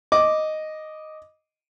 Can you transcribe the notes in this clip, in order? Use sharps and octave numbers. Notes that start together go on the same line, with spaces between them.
D#5 D6